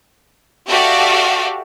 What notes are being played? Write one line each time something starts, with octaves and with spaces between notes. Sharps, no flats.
F#4 G4 A4 D5 E5 F5